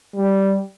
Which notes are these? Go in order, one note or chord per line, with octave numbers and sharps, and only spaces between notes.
G3